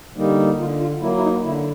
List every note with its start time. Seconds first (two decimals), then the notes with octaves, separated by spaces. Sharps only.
0.16 D3 G3 A#3 D#4
0.59 D3 F4
0.80 F4
1.01 F#3 A#3 E4
1.17 E4
1.23 D#4
1.44 D3 E4